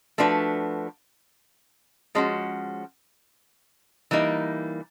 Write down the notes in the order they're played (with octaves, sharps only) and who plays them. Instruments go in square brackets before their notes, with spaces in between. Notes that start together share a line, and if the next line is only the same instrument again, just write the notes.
[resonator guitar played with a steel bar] F3 A3 D4 F#4 B4
F3 G#3 C#4 F#4
E3 G3 A#3 D#4